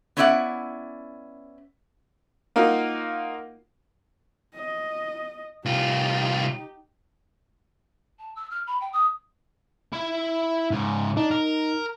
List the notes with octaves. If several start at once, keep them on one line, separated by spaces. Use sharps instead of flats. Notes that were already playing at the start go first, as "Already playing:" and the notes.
B3 C#4 D4 E4 D5 F#5
A#3 D#4 F4 F#4 A#4
D#5
C2 D#4 F4 G4
A5
E6
F6
B5
G5
D#6
E4 E5
G#2 C#3
D4 D#4
A#4